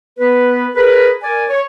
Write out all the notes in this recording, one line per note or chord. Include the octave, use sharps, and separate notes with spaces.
B3 B4
G#4 A#4 B4
A#4 D5 G#5
C#5